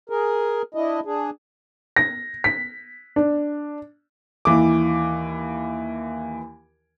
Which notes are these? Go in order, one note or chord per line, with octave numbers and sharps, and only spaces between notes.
G#4 A#4
D4 E4 D#5
D4 G#4
A#6
B6
D4
D#2 E3 D6